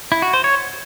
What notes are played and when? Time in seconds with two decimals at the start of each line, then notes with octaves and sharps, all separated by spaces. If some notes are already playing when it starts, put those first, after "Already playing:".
0.12 E4
0.22 F#4
0.33 C5
0.44 C#5